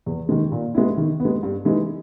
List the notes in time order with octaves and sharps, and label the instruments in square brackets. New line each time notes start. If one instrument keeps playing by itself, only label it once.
[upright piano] E2
D#3 G#3
A#2
G#3 B3 E4
D#3
B3
G#3
G2
E3 G#3 D#4